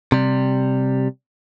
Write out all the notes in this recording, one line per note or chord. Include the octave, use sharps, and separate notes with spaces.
C3 G3